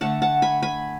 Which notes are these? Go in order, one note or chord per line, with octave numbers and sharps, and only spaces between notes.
D3 A3 F#5 A5
F#5 A5
G#5 B5
G#5 B5